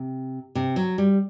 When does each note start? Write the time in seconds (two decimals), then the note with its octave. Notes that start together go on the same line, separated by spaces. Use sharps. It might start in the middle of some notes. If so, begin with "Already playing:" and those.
Already playing: C3
0.55 C3
0.76 F#3
0.98 G3